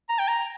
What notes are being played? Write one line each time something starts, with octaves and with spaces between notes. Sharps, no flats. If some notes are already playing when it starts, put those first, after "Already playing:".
A#5
G5
A#5